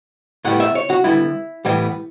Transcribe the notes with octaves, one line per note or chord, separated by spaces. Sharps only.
A2 G3 B3 F#5
E5
C#5
F#4
D3 G3 B3 E4
A2 E3 G3 B3